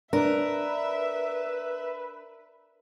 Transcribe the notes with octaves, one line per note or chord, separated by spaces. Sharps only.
D4 A#4 B4 E5